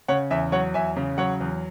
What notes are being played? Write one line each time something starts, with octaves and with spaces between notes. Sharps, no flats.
C#3 C#5 F#5
E2 E5 G#5
F#3 C#5 F#5
E2 E5 G#5
C#3
F#3 C#5 F#5
E2